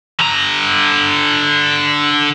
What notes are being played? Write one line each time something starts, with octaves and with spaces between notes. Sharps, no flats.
D3 A#5